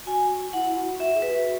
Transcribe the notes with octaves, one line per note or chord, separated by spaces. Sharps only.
F#4 G#5
E4 F#5
F#4
F#4 E5
G#4
B4
F#4